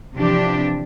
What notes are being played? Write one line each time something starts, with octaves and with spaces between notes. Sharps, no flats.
C3 E3 F3 D4 G4